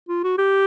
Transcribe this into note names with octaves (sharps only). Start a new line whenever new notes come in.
F4
F#4
G4